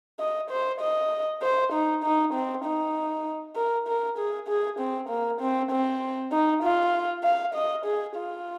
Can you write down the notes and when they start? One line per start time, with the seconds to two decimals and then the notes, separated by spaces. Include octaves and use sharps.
0.19 D#5
0.51 C5
0.81 D#5
1.43 C5
1.73 D#4
2.04 D#4
2.34 C4
2.65 D#4
3.56 A#4
3.88 A#4
4.18 G#4
4.48 G#4
4.79 C4
5.09 A#3
5.41 C4
5.71 C4
6.32 D#4
6.63 F4
7.24 F5
7.54 D#5
7.85 G#4
8.16 F4